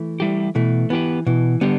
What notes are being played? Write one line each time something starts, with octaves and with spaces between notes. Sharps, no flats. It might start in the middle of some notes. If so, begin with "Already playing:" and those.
Already playing: E3 A3
G3 E4 G4
B2 E3 A3
E3 B3 G4 B4
B2 E3
D3 G3 B3 G4